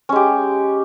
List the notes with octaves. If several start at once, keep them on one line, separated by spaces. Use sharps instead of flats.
G#3 C#4 G4